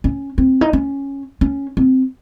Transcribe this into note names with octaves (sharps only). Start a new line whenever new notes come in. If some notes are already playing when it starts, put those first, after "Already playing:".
C#4
C4
D#4
C#4
C#4
C4